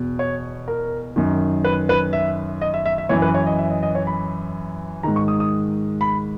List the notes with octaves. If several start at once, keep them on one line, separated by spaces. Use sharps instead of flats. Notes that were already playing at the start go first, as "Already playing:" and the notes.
Already playing: E2 B2
C#5
A#4
F#2 D#3
B4
B4
E5
D#5
E5
E5
E5
F#2 E3 C#5
B4
C#5
D#5
E5
D#5
D#5
C#5
B5
G#2 D#3 A#5
C#6
D#6
D#6
B5